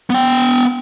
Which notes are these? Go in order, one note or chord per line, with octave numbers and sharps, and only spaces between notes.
B3 G5